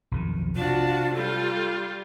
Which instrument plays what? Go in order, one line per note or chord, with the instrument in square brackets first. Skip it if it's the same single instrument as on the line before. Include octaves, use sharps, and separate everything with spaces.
[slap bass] B1 F2 D#3
[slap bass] C3 [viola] D4 F#4 [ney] F4
[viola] G3 F4 [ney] A4